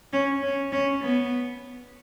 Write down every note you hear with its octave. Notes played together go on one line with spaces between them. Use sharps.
C#4
C#4
C#4
B3